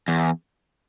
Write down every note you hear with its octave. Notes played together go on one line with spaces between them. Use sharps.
E2